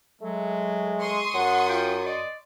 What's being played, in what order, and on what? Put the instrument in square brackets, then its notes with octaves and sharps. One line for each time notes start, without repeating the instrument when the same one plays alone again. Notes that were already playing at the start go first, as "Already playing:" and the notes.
[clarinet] F#3 [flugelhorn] G#3 [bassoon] A3
[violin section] C6 C#6 D#6
[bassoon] F#2 [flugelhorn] F#5
[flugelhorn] F4 [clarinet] G5
[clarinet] D5 [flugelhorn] D#5